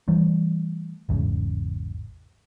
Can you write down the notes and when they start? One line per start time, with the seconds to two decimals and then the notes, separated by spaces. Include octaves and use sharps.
0.08 E3 G3 A3
1.09 A1 E2 G#2 C#3